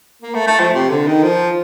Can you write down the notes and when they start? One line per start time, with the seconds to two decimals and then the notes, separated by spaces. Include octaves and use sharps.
0.22 A#3
0.34 A3
0.47 A3
0.60 F3
0.74 C3
0.90 D3
1.07 D#3
1.23 F3